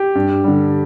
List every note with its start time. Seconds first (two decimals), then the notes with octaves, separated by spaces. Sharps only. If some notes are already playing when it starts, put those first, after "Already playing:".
Already playing: G4
0.15 G2
0.44 D3 G3